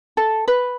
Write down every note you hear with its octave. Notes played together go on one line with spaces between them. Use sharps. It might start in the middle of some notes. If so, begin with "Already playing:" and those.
A4
B4